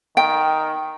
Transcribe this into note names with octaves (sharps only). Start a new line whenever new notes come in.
D#3 G5